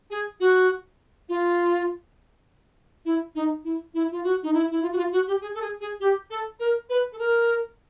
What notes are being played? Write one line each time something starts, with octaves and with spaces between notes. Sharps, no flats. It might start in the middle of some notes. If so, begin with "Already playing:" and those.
G#4
F#4
F4
E4
D#4
E4
E4
F4
F#4
D#4
E4
E4
F4
F#4
F4
F#4
G4
G#4
A4
G#4
G#4
G4
A4
A#4
B4
A4
A#4